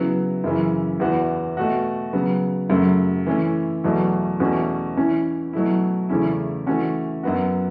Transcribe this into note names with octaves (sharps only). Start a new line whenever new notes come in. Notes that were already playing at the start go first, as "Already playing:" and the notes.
Already playing: C#3 F#3 B3 E4
F#2 C#3 E3
E2 E3 B3 F#4
B2 A3 F#4
C#3 F#3 B3
F#2 C#3 F#3 A3
E3 A3 C#4 E4
E2 B2 F#3 A3
E2 B2 A3 C#4 F#4
E3 C#4 E4
B2 F#3 A3 E4
E2 C#3 A3 C#4 E4
E3 A3 C#4 F#4
F#2 F#3 B3 F#4